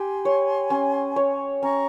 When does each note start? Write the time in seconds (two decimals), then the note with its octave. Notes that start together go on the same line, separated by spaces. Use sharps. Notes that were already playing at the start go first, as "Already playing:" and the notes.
Already playing: G4 G#5 C6
0.25 C#5
0.70 C#4
1.16 C#5
1.63 C#4 A#5 C#6